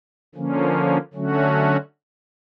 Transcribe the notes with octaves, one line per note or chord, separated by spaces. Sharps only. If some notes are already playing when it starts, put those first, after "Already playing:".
D3 F3 A#3 C#4
D3 F#3 A3 C#4 F#4